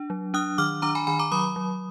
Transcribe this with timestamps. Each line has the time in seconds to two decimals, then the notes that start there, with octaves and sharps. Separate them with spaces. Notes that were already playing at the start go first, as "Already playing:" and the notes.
Already playing: D4
0.10 F#3
0.34 D4 D#6 F#6
0.58 D#3 D6 F6
0.82 D4 A#5 D6
0.95 G#5 B5
1.07 D#3 G#5 B5
1.19 A#5 D6
1.32 F#3 B5 D#6
1.56 F#3